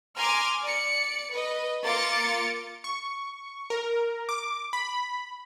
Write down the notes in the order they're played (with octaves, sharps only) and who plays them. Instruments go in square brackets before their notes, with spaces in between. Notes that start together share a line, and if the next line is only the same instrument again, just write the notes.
[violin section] G#5 A#5 C6 D6 F6
D5 C#7
B4 D#5
A#3 F4 C6 D6 A6 C#7
[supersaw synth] C#6
A#4
D6
B5